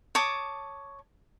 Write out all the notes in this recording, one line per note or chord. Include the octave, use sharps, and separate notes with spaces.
C#5 A5 D6 D#6